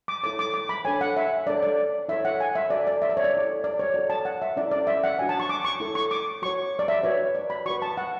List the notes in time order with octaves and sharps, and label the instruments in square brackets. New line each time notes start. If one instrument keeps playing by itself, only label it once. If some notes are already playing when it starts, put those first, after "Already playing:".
[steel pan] D6
E4 A4 C#5 D6
D6
D6
B5
D4 A4 C#5 G#5
F#5
E5
D4 A4 C#5 D5
D5
E4 A4 C#5 E5
F#5
G#5
E5
F#4 A4 C#5 D5
D5
E5
D5
C#5
D5
E4 A4 C#5
D5
C#5
F#4 A4 C#5 D5
A5
F#5
E5
C#4 E4 A4 D5
D5
E5
F#5
D4 F#4 C#5 G#5
A5
C#6
D6
C#6
E4 A4 C#5
C#6
D6
F#4 C#5 C#6
D5
E5
F#4 B4 C#5
D5
B5
F#4 B4 C#6
A5
F#5